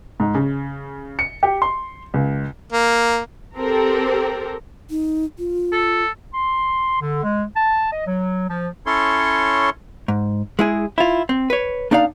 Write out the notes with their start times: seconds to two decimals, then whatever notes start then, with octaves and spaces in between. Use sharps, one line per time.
0.20 G#2
0.35 C#3
1.19 C#7
1.43 G4
1.62 C6
2.14 C#2
2.72 A#3
3.58 C4 G4 A4 A#4
4.90 D#4
5.39 F4
5.72 A4
6.34 C6
7.00 D3
7.23 G#3
7.55 A5
7.92 D#5
8.06 F#3
8.49 F3
8.86 C#4 E4 A4 C#5 C6
10.08 G#2
10.59 G#3 E4 G#4
10.98 E4 F4
11.29 C4
11.50 B4 C#5
11.91 A#3 D4 D#4 D5 F5 A#5